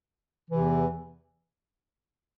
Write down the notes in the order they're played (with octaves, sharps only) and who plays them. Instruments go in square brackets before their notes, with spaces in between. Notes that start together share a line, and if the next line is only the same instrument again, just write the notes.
[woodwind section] E2 C3 E3